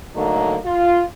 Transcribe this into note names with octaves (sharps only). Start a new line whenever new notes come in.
D3 F#3 A3 A#3 D#4
F4